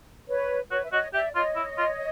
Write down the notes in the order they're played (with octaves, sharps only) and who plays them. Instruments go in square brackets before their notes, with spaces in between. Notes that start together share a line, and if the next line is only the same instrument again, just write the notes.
[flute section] B4 C#5
[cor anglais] F#4 [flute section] B4 C#5
[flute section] E5
[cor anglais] F#4 [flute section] C#5 D#5
[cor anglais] G4 [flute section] D5 E5
[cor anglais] F4 [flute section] C#5 D#5
[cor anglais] E4
F4